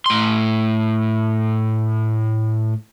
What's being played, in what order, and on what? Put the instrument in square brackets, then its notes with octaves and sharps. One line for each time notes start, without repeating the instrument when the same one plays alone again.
[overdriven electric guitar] A2 C6